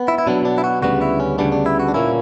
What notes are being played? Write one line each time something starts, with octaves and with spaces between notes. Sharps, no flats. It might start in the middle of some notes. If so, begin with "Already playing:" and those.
Already playing: B3
E4
E4
B2 F#3 B3 D4
D4
E4
F#4
D2 C#3 G3 B3 F#4
E4
C#4
D2 C#3 G3 B3 D4
D4
E4
F#4
D4
A#2 A#3 C#4 E4